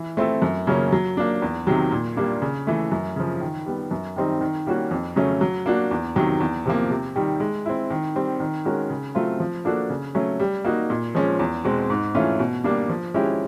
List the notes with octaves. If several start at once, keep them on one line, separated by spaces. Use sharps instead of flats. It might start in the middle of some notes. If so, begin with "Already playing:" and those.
Already playing: E3
A3 C4 E4 A4
F#2
C#3 F#3 A#3 C#4
F#3
A#3 D4
E2
C3 D#3 F#3
A#2
G3 A#3 D4
C#3
E3 A3
F#2
C#3 F3
D#3
G3 B3
F#2
D#3 G3 C4 D#4
D#3
G3 A#3 C#4 F#4
F2
C#3 F#3 A3 C#4
F#3
A#3 D4 F#4
E2
C3 D#3 F#3
E2
C3 F3 A#3
C3
D#3 G3
G#3
C4 E4
D#3
G3 C4
D#3
G#3 C#4 F#4 A#4
C#3
F#3 A3 C4 F4
F3
A#3 D4 F#4 A4
C#3
F#3 A3 C#4
G3
A#3 D#4 F#4
A#2
F3 G#3 C#4
E2
B2 G#3 C4
G#2
E3 A3 C#4 F4
B2
G3 A#3 D4
F3
G#3 C#4 E4 G4